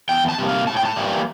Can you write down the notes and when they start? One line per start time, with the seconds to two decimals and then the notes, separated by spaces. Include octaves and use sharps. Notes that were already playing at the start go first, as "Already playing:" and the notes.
0.09 E2 G5
0.29 A5
0.38 C3 G3 A#3
0.49 F5
0.67 A2 A5
0.77 G5
0.85 A5
0.96 E3 G3 A#3